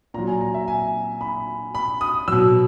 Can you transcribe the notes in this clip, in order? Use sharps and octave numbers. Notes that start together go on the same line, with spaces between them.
A#2 F#3 A#5
G#5
A#5
E5
G#5
B5
B5
D#6
B2 F#3 E6